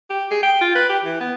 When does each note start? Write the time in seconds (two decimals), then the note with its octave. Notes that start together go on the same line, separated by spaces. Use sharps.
0.10 G4
0.31 G#4
0.43 G5
0.61 F4
0.75 B4
0.89 G4
1.04 E3
1.21 B3